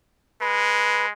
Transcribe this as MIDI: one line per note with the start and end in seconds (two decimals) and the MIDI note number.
0.41 1.12 56
0.41 1.06 71